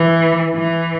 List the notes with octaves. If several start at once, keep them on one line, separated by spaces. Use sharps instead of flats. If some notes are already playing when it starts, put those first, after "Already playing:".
Already playing: E3
E3